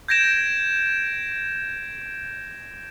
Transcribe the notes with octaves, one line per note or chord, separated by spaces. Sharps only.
G6 G#6 A#6 D7 E7